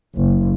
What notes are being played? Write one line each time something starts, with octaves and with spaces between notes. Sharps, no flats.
F#1